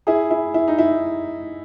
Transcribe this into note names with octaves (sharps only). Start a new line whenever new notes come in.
E4 G#4
E4
E4
D#4
E4